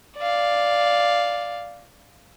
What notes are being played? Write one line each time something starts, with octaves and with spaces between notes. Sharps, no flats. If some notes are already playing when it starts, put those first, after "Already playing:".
D5 F5